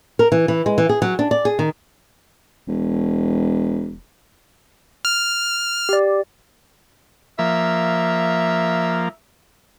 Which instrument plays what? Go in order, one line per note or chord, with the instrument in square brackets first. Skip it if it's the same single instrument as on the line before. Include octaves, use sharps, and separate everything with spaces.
[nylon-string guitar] A#4
E3
E3
G#3
E3
G#4
F#3
D4
D5
G#4
D#3
[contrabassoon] E1
[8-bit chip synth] F6
[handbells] G4 D5
[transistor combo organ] F3 A#3 [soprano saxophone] E5